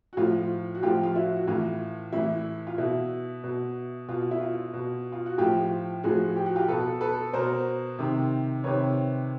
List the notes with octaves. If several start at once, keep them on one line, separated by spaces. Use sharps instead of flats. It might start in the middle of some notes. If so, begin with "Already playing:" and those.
F#4
A2 F3 F4
F#4
A2 F3 F4 G4
F4
E4 F#4
F#4
A2 E3 F4
A2 E3 E4
F4
B2 E4
B2
B2 F4
E4
F4
B2
F4
F#4
A2 F3 F4 G4
A2 F3 F#4 G#4
G4
F#4
F4 G4
B2 A4 B4
A4 B4
B2 A#4 C5
C3 D#3
C3 D#3 B4 C#5